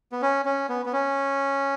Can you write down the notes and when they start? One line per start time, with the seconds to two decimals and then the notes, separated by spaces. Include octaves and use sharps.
0.12 B3
0.22 C#4
0.45 C#4
0.69 B3
0.86 B3
0.93 C#4